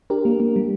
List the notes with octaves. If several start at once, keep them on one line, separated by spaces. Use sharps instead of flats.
D4 G4 A#4
A#3
A#3
G3